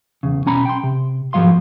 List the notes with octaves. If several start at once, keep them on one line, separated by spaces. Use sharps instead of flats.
E2 C#3
B1 C#4 A#5 B5
G5 C6
C3
G#2 F3 F#3 F5 C6